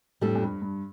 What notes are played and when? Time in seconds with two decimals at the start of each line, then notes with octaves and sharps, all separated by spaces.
0.21 F2 A2 G3 D4 A4
0.35 F2
0.43 G2
0.62 G2